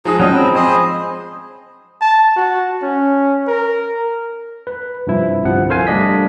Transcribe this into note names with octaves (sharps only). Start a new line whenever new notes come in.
F3 G#3 D#4 G#4 A#5 D#6
F#3 C#4 D5 D#5 G5
C4 B5
G#4 C5 D#5
A5
F#4
C#4
A#4
B4
G2 C3 F3 E4
G1 C2 C3 F3 F#5
A4 A#4 C5 F5 G#5
G3 A3 D4 D#5 B6